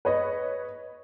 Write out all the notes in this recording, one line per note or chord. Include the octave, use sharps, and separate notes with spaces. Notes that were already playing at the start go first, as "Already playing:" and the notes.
B4 C#5 D#5